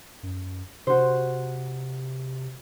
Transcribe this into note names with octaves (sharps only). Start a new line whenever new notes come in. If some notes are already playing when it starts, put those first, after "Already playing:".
F#2
C3 F#4 C5